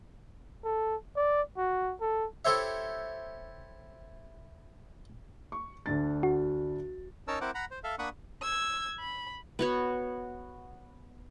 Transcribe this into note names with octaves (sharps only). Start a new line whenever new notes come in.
A4
D5
F#4
A4
E4 G4 A4 C5 C#5 E5
C#6
D2 D4 A6
F#4
C#4 D#4 A#4 C#5 A5 E6
C4 E4 A#4 C5 F#5 D6
F#5 A#5 B5
C5
A4 E5 F5
A#3 D4 F#5 B5 C#6 D#6
E6 G#6
B5
B3 F#4 C#5